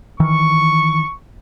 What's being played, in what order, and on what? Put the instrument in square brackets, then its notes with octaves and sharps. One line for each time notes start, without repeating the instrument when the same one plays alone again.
[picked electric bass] D#3 E3 [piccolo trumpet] C#6